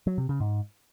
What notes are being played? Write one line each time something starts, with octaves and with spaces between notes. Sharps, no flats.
F#3
C3
C#3
G#2